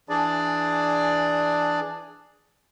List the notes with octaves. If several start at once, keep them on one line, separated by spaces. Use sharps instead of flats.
E3 D4 G#4 D5